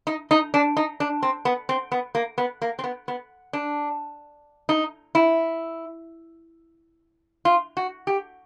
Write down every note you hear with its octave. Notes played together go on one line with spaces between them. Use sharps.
D#4
D#4
D4
D#4
D4
C4
B3
C4
B3
A#3
B3
A#3
C4
B3
B3
D4
D#4
E4
F4
F#4
G4